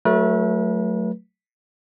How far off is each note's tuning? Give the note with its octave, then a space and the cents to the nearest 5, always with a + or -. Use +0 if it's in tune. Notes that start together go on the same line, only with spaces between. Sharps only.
F#3 +0 A3 +0 B4 -40